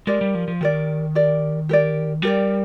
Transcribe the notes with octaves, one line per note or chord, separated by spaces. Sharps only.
G#3 G4 A#4 D5
G3
F3
F3
D#3 G4 A#4 D5
G4 A#4 D5
G4 A#4 D5
G3 G4 A#4 D5